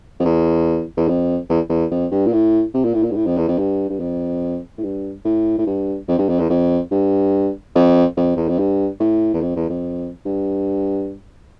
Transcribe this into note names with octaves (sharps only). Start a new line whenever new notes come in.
F2
E2
E2
F2
E2
E2
F2
G2
A#2
A2
C3
A#2
A2
A#2
G2
A2
F2
E2
F2
G2
G2
F2
A2
G2
A2
A2
G2
F2
G2
F2
E2
F2
G2
F2
F2
E2
F2
G2
A2
E2
F2
E2
F2
G2